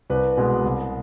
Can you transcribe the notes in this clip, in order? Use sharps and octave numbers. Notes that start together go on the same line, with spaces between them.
C2 B4
B2 G#3
C2